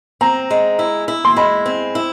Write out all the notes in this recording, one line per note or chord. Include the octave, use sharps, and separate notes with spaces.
C4 A#5
G#3
E4
E4
C6
G#3 B5
C4
E4